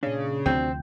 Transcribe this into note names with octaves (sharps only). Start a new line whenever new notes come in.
A#2 C#3 D4
D2 C3 F3 C4 D4 F#4